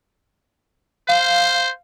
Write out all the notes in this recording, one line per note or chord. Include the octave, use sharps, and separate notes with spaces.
C5 F5